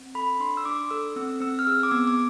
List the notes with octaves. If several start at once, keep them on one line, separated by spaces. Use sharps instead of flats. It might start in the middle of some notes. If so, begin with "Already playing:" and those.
Already playing: C4
A4 B5
D4 C6
E6
D4 D6
A4 E6
C4 E6
C4 E6
F6
G#4 E6
D6
B3 E6
D6